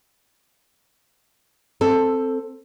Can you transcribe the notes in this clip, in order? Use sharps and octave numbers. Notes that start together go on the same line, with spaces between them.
C4 A4